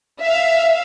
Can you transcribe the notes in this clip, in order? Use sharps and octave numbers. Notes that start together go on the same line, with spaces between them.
E5 F5